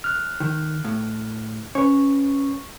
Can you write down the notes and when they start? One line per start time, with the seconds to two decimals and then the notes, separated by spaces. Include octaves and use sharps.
0.04 F6 F#6
0.40 D#3
0.84 A2
1.75 C#4 B4 C#5